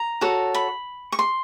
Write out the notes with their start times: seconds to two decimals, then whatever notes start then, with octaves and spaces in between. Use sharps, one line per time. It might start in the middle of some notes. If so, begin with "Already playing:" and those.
Already playing: A#5
0.21 F#4 A4 C#5
0.54 B5
1.12 C#6
1.19 C6